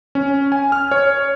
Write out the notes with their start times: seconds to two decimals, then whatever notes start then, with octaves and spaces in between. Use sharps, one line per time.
0.15 C#4
0.52 G#5
0.72 F6
0.91 C#5